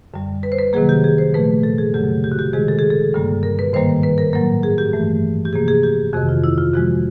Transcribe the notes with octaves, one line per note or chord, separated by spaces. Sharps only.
F#2 D3 G3
B4
C5
B4
C3 D#3 F#3 A#3 G#4
G4
G#4
C5
A#2 F3 A3 B4
A4
G#4
F#2 C#3 F#3 A3 G4
G4
F#4
G4
C3 D#3 G#3 G#4
A4
G#4
A4
G2 D3 G3 A#3
A#4
B4
G#2 D#3 G3 A#3 C5
B4
A#4
A2 F#3 A#3 A#4
G#4
G4
G2 E3 A3
G4
C3 F3 A#3 G#4
G#4
G4
F2 C3 D#3 F#4
F4
E4
F4
C3 F3 G#3 F#4